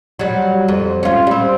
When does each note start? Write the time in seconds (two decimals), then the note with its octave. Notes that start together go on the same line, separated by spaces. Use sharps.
0.19 F#3 G3
0.68 F2
1.03 C#4 F4
1.27 G3 C4